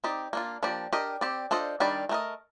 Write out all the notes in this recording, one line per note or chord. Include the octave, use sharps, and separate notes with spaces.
C4 D#4 G4 D5
A#3 D4 F4
F3 A#3 D4 G4 D5
D4 G4 A#4 D#5
C4 G4 D5
D4 F4 A4 C5 D#5
D#3 G3 D4 G4 D5
A3 D#4 A#4 D#5